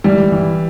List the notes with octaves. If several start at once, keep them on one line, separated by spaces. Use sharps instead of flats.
E3 G3
E3